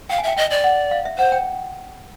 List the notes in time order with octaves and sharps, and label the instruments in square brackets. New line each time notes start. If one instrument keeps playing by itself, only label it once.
[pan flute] F5 [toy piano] G5
[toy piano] G#5
[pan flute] E5 [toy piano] G5
[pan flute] D#5 [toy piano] G5
[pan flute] D5
[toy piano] F#5
F5
E5
[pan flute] C5 [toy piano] F#5
[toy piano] G5